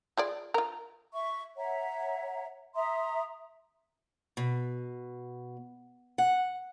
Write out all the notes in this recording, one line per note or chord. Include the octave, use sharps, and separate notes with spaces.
F4 G#4 D5
F4 A#4
E5 C#6
C#5 E5 F#5 A#5
E5 A#5 C6 D#6
B2
F#5